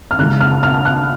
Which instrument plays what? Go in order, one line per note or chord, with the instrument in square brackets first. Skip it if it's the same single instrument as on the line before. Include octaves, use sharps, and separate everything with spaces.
[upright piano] F6
C#3 E3 G#3 F#6
F6
F6
F#6